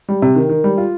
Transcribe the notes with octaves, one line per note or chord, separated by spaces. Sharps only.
G3
C3
D#3
D#3
G3
F4